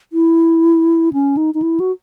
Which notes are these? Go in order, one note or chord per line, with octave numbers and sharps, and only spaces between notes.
E4
C#4
D#4
D#4
E4
F#4